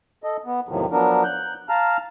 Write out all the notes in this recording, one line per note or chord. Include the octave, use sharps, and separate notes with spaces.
A4 D#5
B3
E2 A2 C3 D#3 F3 F#3
F3 F#3 B3 D4 A#4
F#6 G6
F5 A5 A#5 F6